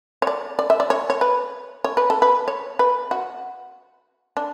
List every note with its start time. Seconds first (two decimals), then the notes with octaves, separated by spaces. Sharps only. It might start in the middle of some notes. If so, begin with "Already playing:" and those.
0.22 C#5
0.27 D5
0.59 D5
0.70 E5
0.80 D5
0.90 C#5
1.10 C#5
1.21 B4
1.84 C#5
1.97 B4
2.10 A4
2.22 B4
2.48 C#5
2.79 B4
3.11 F#4
4.37 D4